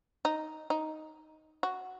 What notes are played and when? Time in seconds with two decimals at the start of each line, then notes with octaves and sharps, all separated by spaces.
0.25 D#4
0.70 D#4
1.63 F#4